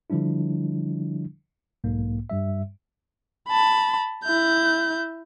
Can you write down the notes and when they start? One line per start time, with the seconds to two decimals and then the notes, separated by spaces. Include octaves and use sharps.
0.10 D3 F3 G3 D4 E4
1.84 B1 G#2 A#3
2.30 G2 G3 E5
3.49 A5 B5
4.24 E4 G6